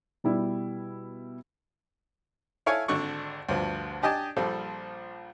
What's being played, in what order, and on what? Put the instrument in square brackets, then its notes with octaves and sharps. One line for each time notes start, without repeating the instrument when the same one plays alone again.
[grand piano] B2 G3 E4
[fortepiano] E4 A4 C#5 F5 G#5 C#6
G#1 D3 D4 C#6
D2 G2 F3
D4 G4 D#5 G#5 A5
A#1 F3 G3 A4